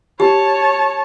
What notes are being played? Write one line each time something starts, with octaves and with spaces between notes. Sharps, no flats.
G4 C#5 A5